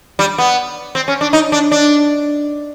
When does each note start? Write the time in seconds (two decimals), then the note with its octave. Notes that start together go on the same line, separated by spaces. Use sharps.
0.19 G3
0.38 B3
0.95 C4
1.08 C#4
1.21 D4
1.33 D#4
1.52 D4
1.72 D4